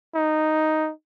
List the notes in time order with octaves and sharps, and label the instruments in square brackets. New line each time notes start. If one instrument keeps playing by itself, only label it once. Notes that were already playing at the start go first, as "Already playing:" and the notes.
[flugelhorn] D#4